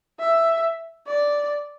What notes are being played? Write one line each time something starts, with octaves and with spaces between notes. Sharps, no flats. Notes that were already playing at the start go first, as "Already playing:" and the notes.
E5
D5